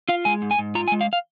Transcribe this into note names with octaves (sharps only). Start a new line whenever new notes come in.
F4 F5
G#3 G#5
G#2
G#5
G#2
F4 A#5
G#5
G#3
F5
F5